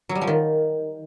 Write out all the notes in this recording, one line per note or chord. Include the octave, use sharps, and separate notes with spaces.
F#3
G3
F3
D#3